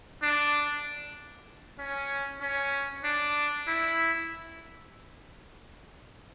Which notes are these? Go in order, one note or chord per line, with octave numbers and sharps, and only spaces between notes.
D4
C#4
C#4
D4
E4